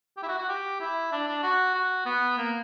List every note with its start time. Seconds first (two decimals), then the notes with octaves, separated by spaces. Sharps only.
0.17 G4
0.23 E4
0.28 F#4
0.38 F#4
0.48 G4
0.80 E4
1.12 D4
1.27 D4
1.43 F#4
1.75 F#4
2.06 B3
2.38 A#3